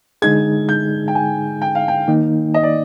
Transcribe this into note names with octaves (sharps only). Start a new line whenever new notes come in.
D3 G#3 D#4 G#4 G#6
G6
G5
G#5
G5
F5
G5
D#3 A#3 D#4
D#5
D5